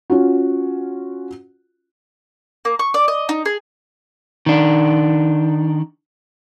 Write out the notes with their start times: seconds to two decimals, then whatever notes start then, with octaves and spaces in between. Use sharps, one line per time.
0.10 C#4 F4 F#4
2.65 A#3
2.79 C#6
2.94 D5
3.08 D#5
3.29 D#4
3.46 G#4
4.46 D#3 D4